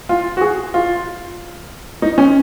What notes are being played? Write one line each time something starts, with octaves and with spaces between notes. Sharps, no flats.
F4
F#4
G#4
F4
D#4
C#4